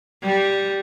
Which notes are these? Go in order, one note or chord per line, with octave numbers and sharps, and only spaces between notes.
G3